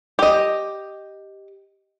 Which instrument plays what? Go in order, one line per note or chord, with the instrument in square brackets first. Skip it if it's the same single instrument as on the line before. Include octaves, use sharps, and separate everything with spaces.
[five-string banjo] G4 D#5